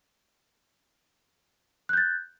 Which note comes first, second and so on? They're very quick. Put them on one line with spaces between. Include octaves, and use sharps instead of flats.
F#6 G6 A6